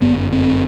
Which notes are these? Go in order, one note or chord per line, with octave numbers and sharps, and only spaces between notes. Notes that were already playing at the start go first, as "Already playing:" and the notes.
G1 F#2 B3
C4